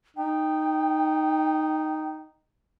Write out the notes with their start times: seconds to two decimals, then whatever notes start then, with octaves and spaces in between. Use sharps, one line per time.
0.17 D#4 G5